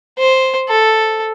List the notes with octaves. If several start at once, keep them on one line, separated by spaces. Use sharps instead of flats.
C5
A4